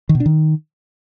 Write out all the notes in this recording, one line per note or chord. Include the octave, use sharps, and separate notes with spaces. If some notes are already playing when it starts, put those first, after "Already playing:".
D#3
B2
D4
D#3